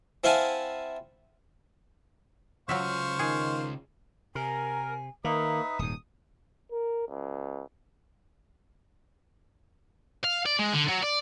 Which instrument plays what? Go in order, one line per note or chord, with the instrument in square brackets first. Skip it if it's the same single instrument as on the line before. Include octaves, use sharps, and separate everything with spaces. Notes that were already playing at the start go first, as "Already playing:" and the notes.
[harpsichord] C4 E4 F5 F#5 G#5 A5
[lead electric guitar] C#3 F4 [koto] F#3 F#4 E5 [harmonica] C5 F5 C#6
[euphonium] D#3 [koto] G#4
[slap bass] C3 [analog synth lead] A#4 [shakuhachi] G#5
[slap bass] D#3 [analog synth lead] A#3 [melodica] D#4 B4 E5 [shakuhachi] D#6
[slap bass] D#1 G#2 [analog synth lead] D#6
[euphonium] A#4
C#2
[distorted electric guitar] F5
D5
G#3
D3
F#3
D5